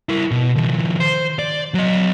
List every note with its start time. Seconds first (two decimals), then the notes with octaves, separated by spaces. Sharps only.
0.09 E4 A#4
0.31 B2
0.56 D#3 F3
1.00 C5
1.39 D5
1.75 F#3 D#5